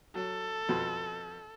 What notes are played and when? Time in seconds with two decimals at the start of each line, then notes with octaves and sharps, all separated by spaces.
0.15 F#3 A4
0.69 F2 B2